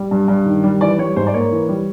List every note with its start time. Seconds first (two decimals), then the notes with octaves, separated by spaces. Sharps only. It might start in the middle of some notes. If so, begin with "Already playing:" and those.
Already playing: G3
0.11 G2
0.28 G2
0.45 D#3
0.64 G3
0.81 E3 D5
0.99 G3 C#5
1.16 G#2 C5
1.27 D5
1.34 A#3 C#5
1.51 E3
1.68 G3